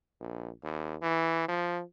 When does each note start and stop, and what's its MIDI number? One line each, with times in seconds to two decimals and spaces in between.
0.20 0.50 34
0.63 0.96 39
1.02 1.44 52
1.48 1.82 53